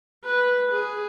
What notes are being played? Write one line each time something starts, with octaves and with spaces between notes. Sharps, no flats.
B4
G#4